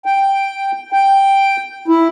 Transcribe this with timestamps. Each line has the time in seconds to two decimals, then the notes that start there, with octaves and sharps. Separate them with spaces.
0.06 G5
0.92 G5
1.88 E4